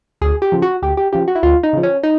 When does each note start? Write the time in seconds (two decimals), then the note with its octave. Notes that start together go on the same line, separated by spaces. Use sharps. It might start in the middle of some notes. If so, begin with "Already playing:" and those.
0.21 D2 G#4
0.42 G4
0.52 C#3 F3
0.62 F#4
0.82 D2 G4
0.97 G4
1.13 C#3 F3 G4
1.28 F#4
1.35 E4
1.43 D2 F4
1.63 D#4
1.73 C#3 F3
1.83 C#4
2.03 D#4